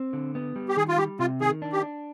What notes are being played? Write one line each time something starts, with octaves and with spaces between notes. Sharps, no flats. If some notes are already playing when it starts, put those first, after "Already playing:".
Already playing: C4
D3
B3
G3
G4
D#3 G#4
F4
G3 G4
C3 F4
D#3 G#4
D4
G4
D4